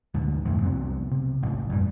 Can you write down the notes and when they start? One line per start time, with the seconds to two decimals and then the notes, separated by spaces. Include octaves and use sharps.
0.14 D2 G#2 B2
0.45 F2 A2 E3 F3
0.63 C2 F#3 B3 C4
1.11 C3
1.42 A1 G#2 C3
1.69 F#2 A#2 G3